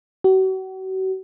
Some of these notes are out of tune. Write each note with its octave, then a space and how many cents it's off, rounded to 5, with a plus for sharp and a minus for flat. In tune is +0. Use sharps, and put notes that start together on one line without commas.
F#4 +40